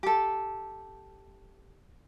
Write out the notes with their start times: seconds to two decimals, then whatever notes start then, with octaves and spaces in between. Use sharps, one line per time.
0.03 G4 A4